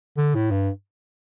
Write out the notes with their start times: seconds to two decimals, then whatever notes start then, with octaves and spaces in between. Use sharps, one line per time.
0.17 D3
0.35 A2
0.51 G2